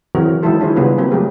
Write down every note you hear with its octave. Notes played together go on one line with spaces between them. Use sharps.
E3 F#3 C4 F#4 G#4 A#4
D#3 F#3 G#3 E4 A4 C5
D4 E4 F4 G#4 C5 C#5
C#3 G3 B3 F4 G#4 B4
F#3 A#3 C4 B4
F#3 A3 G4 G#4